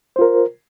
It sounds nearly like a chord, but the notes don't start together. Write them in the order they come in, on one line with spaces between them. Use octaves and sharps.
C5 F4 A#4